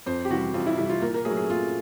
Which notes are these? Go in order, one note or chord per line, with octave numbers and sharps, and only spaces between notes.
F2 C5
G4
C3 E3 G3 F#4
F2 F4
E4
C3 E3 G3
F4
A#2 A#4
A#4
F#3 A3 G#4
G#4
A#2 F4